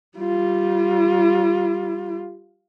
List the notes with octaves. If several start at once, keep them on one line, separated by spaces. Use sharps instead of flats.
G3 F4